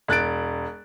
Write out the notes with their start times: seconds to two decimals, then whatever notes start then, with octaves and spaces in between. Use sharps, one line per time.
0.08 E1 F#6 A6 D7